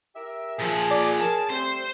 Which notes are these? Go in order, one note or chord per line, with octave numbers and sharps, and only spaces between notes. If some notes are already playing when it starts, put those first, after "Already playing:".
G4 A#4 E5
A#2 F3 G#4
D5
C#4 A#4 A5
G3 A3 C4 C5